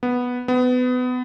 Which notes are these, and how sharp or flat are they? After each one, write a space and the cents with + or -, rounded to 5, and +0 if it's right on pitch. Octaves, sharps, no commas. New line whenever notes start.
B3 -5
B3 +25